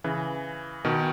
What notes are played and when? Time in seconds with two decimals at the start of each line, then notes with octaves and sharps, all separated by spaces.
0.04 C#3 E3
0.84 B2 D#3